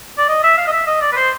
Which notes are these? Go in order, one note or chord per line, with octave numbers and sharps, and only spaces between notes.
D5
D#5
E5
F5
D#5
E5
D#5
D5
B4
C5